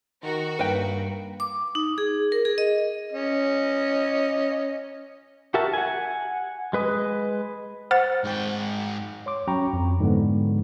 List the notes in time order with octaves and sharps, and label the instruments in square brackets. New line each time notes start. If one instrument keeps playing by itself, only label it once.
[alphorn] D#3 [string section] F#4 A#4
[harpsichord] G2 [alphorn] A#3 [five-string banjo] B4 G5
[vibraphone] D6
D#4
G#4
A#4
G#4
D#5
[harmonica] C#4 D#5
[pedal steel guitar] F#4 G4 A#4 E5 A5
F#5 G#5
G#3 B4 D#5
[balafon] C5 [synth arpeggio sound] F#5 A6
[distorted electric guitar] G#2 G5
[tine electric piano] C#5 C6 D6
F#3 C#4 G5 A#5 B5 C#6
F2
G#2 D3 F3 G#3 B3